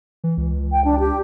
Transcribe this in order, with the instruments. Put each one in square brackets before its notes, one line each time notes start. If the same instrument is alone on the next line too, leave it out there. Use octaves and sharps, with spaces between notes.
[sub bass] E3
C#2
[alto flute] G5
D4
G4